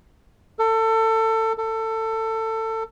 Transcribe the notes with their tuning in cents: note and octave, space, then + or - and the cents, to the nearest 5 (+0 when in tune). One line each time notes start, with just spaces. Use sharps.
A4 +25
A4 +20